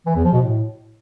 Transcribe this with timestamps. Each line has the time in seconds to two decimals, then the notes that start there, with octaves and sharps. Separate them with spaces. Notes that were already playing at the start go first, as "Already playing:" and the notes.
0.06 E3
0.15 E2
0.24 F3
0.33 B2
0.42 A2